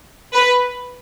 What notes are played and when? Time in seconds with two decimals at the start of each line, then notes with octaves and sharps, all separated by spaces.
0.34 B4